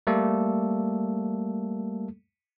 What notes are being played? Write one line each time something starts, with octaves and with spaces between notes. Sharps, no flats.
G3 A3 A#3 A4